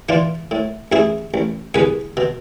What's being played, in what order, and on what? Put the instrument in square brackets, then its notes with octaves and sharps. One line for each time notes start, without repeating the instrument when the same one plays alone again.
[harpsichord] E3 D4 F4
A2
A1 E4 G#4
A1
C2 G#4 B4
B2